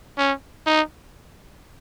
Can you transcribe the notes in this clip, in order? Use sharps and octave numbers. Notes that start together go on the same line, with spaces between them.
C#4
D#4